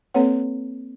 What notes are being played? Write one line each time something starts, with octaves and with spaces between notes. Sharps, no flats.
A#3 C4 A4 B4 C#5 F#5